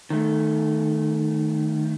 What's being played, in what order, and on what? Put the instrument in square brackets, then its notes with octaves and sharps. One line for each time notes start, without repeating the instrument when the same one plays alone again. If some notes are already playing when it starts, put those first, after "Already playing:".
[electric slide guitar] D#3 A3